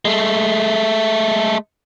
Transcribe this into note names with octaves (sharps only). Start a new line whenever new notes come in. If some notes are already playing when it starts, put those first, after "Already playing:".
G#3 A3